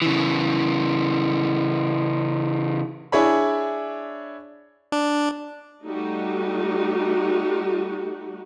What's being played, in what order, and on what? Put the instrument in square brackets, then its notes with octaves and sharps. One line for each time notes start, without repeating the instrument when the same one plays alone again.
[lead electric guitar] C#3 E3
[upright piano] D4 E4 G#4 C#5 B5
[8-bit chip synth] D4
[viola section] G3 A3 D#4 F#4 G4